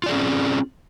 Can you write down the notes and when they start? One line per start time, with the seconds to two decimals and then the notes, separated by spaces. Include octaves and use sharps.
0.04 F4
0.06 D5
0.09 G#4
0.12 C#4
0.15 C4